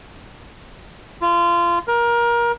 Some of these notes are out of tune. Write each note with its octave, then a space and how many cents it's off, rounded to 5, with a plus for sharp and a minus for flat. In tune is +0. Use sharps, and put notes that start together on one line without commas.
F4 -25
A#4 +25